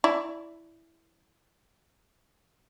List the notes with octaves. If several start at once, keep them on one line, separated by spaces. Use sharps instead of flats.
E4 D5